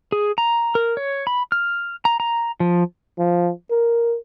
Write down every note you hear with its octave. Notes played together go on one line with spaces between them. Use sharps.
G#4
A#5
A#4
C#5
B5
F6
A#5
A#5
F3
F3
A#4